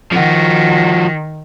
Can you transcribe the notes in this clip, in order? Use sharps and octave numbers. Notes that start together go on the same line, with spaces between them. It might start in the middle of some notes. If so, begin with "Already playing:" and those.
D#3 F3 F#4